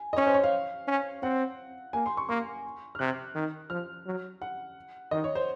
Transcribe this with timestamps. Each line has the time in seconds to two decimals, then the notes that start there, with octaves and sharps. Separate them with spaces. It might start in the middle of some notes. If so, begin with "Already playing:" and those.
Already playing: G#5
0.13 D#5
0.17 C#4 C#5
0.26 C5
0.34 C#5
0.44 F5
0.88 C#4
1.22 C4 F#5
1.93 A#3 G#5
2.06 C6
2.17 C#6
2.29 A#3 C#6
2.95 F6
2.99 C3 F#6
3.35 D#3
3.70 F3 F6
4.05 F#3
4.42 F#5
5.11 D#3 D#5
5.24 C#5
5.35 C5